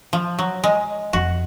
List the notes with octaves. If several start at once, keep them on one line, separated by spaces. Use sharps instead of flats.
F3
F#3
G#3
F2 F#4